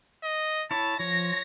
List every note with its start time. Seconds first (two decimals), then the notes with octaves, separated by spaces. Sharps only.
0.23 D#5
0.71 E4 C#5 A5
1.00 F3 C#5 A#6